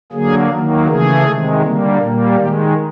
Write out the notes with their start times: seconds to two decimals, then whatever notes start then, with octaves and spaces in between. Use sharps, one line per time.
0.12 D3 F#3 A#3 G#4
0.50 D#3 F#3 A#3
0.87 C#3 E3 A3 G#4
1.24 C3 D#3 G#3
1.62 D3 G3 A#3
1.99 A#2 G3 A#3
2.36 D#3 G#3 G4